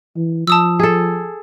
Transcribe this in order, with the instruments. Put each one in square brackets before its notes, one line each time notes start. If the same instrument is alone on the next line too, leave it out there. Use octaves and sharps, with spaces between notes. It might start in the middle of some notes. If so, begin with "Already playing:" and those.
[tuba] E3
[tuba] F3 [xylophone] A5 D#6 E6
[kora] G#4 A4